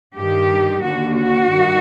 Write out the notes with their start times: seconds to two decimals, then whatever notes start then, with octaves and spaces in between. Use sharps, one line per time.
0.15 G2 D#3 G4
0.82 D#2 D3 F#4
1.15 F#4
1.49 G2 D#3